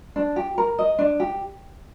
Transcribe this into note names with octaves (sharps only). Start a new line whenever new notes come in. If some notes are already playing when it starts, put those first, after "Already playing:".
D4
G4
A#4
D#5
D4
G4